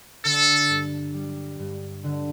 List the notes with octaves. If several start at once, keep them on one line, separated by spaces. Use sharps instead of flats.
D3 A4
G2
G3
G2
D3